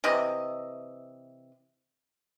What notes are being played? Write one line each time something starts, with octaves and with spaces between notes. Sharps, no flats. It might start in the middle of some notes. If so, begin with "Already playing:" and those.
C3 E3 D#5